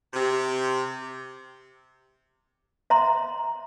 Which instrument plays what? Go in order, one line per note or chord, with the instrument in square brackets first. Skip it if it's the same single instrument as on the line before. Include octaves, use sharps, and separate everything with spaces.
[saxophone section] C3
[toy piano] E5 A#5 C6